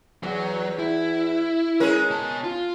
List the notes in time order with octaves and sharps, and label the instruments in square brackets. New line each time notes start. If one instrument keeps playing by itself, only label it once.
[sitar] E2 [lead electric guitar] F#3
[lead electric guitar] E4
[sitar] G#3 C#4 A#4
[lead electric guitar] B2 A5
F4